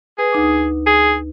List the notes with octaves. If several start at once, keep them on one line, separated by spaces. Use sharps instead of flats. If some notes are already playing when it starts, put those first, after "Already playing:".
G#4 B4
D2 D#4 D6
G#4